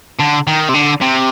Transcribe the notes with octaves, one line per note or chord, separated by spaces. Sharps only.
D3
D#3
C3
D3
C3